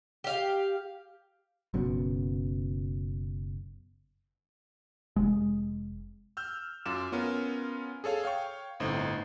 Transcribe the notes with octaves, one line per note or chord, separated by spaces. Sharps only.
G4 F5
F#1 F#2 B2
F1 G#3
E6 F6 G6
F#2 F4 D6 E7
B3 C#4 F4 A#4
G#4 A4 C#5 F5
C#5 F5 G5 C#6
G1 A2 C4 D#4